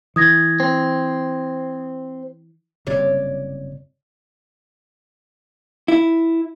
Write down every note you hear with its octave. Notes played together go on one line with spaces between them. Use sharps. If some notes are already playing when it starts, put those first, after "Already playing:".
E3 D#6 G#6 A#6
C4
F#1 G2 C3 C#5 D5
E4